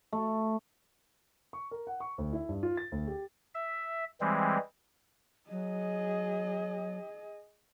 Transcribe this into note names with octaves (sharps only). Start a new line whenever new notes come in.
A3
C#6
A#4
F#5
C#6
D2
E4
G2
F4
A6
D2
G4
E5
E3 G3 G#3 C4
F#3 G#4 D#5